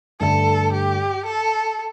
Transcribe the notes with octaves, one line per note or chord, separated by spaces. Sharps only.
G2 D3 A3 A4
G4
A4